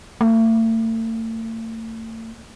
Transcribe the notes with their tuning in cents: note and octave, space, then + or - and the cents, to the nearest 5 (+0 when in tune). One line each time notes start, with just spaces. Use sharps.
A3 +40